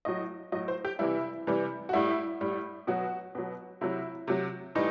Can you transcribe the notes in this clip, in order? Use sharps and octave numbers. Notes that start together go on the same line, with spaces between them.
A2 F#3 D#5
A2 F#3 D#5
C5
G4
C3 E3 G3 E4
C3 E3 G3
F#4
A2 G3 E4
A2 G3
B2 F#3 F#4
B2 F#3
C3 F#3 E4
C3 F#3
A2 E3 G3 D#4